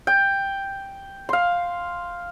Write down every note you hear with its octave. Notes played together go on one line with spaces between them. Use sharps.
G5
F5 C6